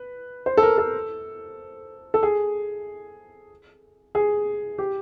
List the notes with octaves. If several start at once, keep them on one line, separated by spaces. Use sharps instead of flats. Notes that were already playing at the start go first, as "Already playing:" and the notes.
Already playing: B4
C5
A4
A#4
A4
A4
G#4
G#4
G4